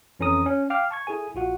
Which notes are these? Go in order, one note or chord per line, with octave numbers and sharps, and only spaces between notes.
F2 E3 C#4 A4 A#5 D#6
C#4
F5 G5 D6 F6
A5 C#6 G#6
E4 G#4 A4 G#5
A#1 F4 F#4 F#5